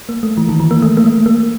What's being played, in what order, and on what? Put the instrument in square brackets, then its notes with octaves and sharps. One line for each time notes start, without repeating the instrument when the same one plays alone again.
[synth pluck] A#3
A3
E3
D#3
E3
A#3
A3
A#3
A3
A#3